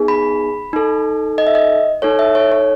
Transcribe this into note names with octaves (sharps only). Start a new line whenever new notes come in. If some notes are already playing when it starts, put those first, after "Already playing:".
Already playing: B3 D#4 G#4
B5
D#4 A4
D#5
E5
D#5
D#4 A4 C#5
E5
C#5
C#5